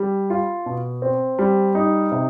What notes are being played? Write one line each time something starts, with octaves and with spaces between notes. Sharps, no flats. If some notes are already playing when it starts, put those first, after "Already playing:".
Already playing: G3
F4
B2
C4
G3
D#4
C3